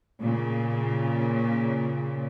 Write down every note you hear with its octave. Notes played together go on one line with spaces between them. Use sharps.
A#2 C#3